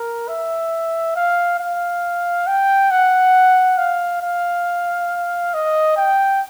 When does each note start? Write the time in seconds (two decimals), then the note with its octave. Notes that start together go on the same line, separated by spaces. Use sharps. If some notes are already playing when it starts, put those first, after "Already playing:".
Already playing: A#4
0.28 E5
1.16 F5
1.60 F5
2.47 G5
2.91 F#5
3.78 F5
4.22 F5
5.54 D#5
5.97 G5